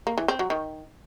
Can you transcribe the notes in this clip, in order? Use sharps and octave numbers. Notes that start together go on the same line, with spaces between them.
A#3
E3
C4
F#3
D#3